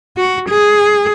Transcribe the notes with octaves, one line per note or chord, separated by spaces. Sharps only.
F#4
G#4